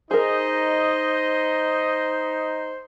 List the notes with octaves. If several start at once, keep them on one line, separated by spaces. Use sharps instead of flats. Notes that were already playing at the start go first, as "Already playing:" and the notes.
D#4 G#4 A#4 C5 D#5